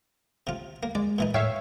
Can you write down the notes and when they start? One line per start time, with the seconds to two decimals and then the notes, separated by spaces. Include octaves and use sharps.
0.47 C3 F4
0.83 A#3
0.95 G#3 D5
1.19 A#2 E3 D#4
1.34 A2 C#5 E5 F5 G5